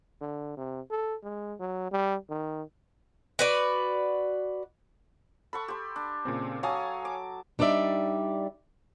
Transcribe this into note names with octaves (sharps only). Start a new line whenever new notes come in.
D3
C3
A4
G#3
F#3
G3
D#3
F#4 B4 D5
A4 F#5 B5 C#6
G4 C6
D4
A#2 C#3 C4
F#3 C#5 F5 G#5 A5 D#6
D6
G3 D4 D#4 D5 E5